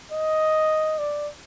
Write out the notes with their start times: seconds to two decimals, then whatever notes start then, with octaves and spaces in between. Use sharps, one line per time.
0.12 D#5
0.99 D5